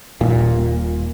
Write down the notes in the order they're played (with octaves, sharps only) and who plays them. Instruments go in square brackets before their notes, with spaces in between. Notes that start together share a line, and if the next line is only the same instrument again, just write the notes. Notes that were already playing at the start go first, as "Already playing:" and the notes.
[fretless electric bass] D#1 A#2